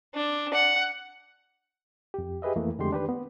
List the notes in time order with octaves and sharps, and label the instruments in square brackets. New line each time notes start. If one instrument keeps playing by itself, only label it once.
[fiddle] D4
F#5
[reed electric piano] F2 G4
G4 G#4 B4 D#5 E5
F2 E3 A3 A#3
F2 D3 G#3 A3 G4 C6
D#3 D4 G4 B4
B3